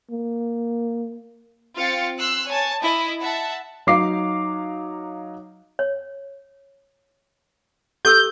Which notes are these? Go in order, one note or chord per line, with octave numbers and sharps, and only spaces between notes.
A#3
C4 F4 F5 G5 A6 C#7
C6 E6 F#6
C#5 G#5 A5
E4 D#5 B5
E5 F#5 A5
F#3 D#4 F5 D6 C7
C#5
G4 A4 E6 G6